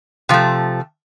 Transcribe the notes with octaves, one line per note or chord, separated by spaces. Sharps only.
C3 F3 A3